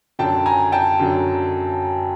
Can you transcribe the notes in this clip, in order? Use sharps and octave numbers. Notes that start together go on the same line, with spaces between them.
F#2 D3 F#3 G5 A5
G#5 A#5
G5 A5
F#2 D3 F#3